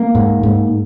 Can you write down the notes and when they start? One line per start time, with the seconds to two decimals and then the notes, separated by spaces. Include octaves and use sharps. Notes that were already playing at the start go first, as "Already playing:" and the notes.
Already playing: A#3
0.15 G#2
0.43 G#2